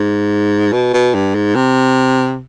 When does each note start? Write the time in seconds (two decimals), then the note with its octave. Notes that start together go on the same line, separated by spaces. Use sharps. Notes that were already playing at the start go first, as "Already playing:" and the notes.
Already playing: G#2
0.72 B2
0.93 B2
1.14 G2
1.35 G#2
1.55 C3